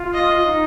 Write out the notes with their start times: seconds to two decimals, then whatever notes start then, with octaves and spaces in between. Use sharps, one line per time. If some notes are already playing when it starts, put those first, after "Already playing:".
Already playing: F4
0.14 D#5
0.45 D#4